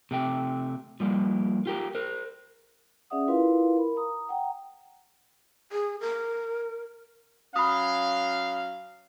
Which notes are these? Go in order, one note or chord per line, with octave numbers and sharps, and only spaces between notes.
C3 A3 G5
F3 G3 A#3
F4 G4 A#4
A#4 C5
C#4 G#4 D5 E5 F#5 D#6
E4 F4 A#4 B4 F5 C6
A#4 B5
A#5 D#6
F#5 G5 A#5
G#4
A#4
F#3 C#4 F5 B5 D#6